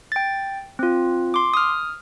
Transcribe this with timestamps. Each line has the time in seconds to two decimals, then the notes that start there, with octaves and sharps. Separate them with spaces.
0.12 G5 A6
0.79 C4 F4
1.34 C6 D6
1.54 D#6 F6